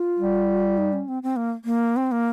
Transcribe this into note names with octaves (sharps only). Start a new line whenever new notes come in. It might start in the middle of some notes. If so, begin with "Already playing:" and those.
Already playing: F4
G3
D#4
C#4
C4
C4
A#3
A#3
C4
A#3